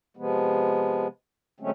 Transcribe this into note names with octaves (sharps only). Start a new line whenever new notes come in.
C3 F3 G#3 B3
D3 F#3 G#3 A3 C4 C#4